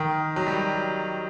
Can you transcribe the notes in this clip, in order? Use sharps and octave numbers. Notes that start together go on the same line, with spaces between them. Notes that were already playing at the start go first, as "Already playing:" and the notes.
Already playing: D#3
F#3
G3